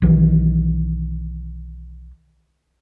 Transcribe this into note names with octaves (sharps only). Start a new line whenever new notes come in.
B1 D#3 E3